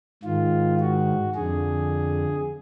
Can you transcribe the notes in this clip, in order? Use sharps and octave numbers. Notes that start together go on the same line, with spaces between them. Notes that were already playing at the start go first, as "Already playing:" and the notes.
G#2 D#3 F4
F#4
F2 D3 G#4